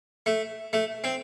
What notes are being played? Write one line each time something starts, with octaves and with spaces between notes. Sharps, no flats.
A3
A3
C4